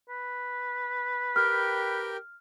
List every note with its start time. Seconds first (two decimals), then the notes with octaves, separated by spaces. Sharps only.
0.09 B4
1.36 G4 A#4 G5 F6